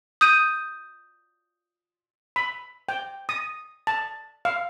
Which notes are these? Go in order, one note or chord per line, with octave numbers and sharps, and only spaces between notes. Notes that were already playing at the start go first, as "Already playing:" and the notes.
D#6 G6 D#7
B5
G5
D#6
A5
F5